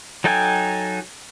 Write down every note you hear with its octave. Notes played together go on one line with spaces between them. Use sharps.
F#3 D#4 A4 G5 G#5